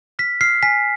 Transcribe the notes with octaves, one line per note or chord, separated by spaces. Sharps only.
F6 B6
F6 C7
G#5 B6